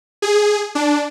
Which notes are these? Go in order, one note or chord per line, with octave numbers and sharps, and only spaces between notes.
G#4
D4